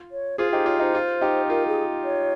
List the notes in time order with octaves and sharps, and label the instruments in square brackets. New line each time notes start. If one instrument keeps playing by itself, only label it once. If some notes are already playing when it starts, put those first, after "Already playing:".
Already playing: [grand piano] F4
[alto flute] C#5
[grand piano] F4 G#4 [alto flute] C5
[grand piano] D#4 G4 [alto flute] C5
[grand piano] F4 [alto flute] C#5
[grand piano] D#4 [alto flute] C5
[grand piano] F4
D#4 G4
[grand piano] F4 [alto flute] A#4
[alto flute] G#4
C#5